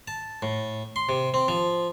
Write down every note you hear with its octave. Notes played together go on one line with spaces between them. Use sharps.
A5
A2
C6
C3
C4
F3